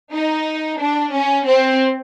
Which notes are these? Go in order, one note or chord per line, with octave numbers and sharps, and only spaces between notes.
D#4
D4
C#4
C4